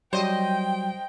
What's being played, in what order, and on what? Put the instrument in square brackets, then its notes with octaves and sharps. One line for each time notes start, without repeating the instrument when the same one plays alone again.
[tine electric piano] F#3 G3 [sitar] C5 D#5 [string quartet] G5